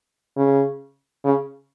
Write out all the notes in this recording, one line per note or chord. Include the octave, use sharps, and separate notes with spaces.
C#3
C#3